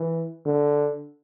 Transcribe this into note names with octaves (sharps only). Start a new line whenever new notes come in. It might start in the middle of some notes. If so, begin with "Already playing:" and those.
Already playing: E3
D3